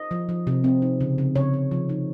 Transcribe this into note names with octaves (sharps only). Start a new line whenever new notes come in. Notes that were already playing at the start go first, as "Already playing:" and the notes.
Already playing: D#5
F3
F3
C3
C4
D#4
C#3
C#3
C#3 C#5
C#3
F3
D#4